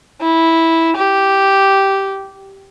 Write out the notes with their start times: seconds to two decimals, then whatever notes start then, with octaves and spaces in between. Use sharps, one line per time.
0.21 E4
0.96 G4